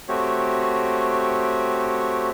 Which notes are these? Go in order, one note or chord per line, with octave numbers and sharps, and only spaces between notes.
A3 C4 F#4 G4 C#5